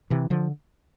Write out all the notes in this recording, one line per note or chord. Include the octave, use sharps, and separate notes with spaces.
C3 E3
D3 F3